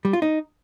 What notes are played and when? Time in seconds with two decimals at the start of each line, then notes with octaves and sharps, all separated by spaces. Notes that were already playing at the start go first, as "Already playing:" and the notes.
0.05 G3
0.13 F4
0.22 D#4